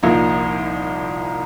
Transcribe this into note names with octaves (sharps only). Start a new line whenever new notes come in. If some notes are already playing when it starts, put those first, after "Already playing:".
C2 A#2 F3 A#3 D#4